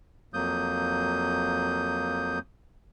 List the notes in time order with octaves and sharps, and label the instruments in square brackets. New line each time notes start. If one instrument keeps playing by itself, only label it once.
[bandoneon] F2 F#3 A#3 D#6 G6